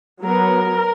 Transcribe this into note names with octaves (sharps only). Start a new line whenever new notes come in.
F#3 B3 A#4